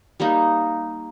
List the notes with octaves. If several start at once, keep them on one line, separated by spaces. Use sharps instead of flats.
G3 A#3 D#4